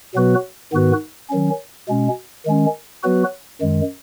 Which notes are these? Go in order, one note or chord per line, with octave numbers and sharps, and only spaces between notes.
B2 F#3 B3 F#4 B4
G#2 D#3 B3 F#4 B4
D#3 F#3 C#4
B2 G#3 C#4
D#3 G#3 C#4
F#3 B3 F#4 B4
F#2 D#3 G#3